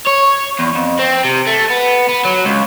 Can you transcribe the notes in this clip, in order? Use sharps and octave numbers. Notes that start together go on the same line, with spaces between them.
C#5
E2
F2
C4
C3
A3
B3
B3
F#3
C#2